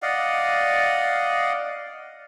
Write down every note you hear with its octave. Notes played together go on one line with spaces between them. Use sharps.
D5 D#5 F5 F#5